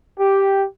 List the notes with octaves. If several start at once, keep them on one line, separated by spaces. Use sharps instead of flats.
G4